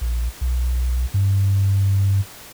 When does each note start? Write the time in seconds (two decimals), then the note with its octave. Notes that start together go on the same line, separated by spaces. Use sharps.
0.01 A#1
0.41 B1
1.14 G2